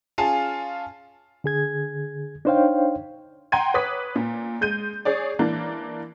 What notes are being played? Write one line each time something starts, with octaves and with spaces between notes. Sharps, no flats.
C#4 F4 G#4 F5 A5
D3 G#4 G#6
D4 D#4 C5 C#5 F5 G5
F#5 G5 A#5 C6 G#6 D#7
B4 C#5 D6 D#6 B6
A#2
G#3 G6 D#7
G#4 C#5 D5
E3 A#3 D4